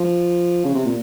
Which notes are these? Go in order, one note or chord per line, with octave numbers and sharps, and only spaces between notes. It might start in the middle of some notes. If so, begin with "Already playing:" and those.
Already playing: F3
C#3
C3
A#2